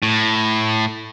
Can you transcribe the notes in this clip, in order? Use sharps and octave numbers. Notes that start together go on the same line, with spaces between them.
A2